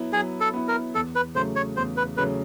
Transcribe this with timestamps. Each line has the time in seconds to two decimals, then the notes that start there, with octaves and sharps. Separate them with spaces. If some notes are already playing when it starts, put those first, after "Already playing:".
Already playing: F#3 B3 E4
0.13 F#3 G#4
0.40 A4
0.54 B3 E4
0.68 A#4
0.95 E2 A4
1.15 B4
1.35 C#3 F#3 A3 C5
1.56 C#5
1.77 E2 C5
1.97 B4
2.17 C#3 F#3 A3 B4